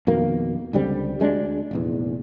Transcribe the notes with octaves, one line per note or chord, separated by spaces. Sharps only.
F2 B2 D#3 A#3
C#2 D3 G3 C4
D2 G#3 C#4 D4
F1 A#1 E2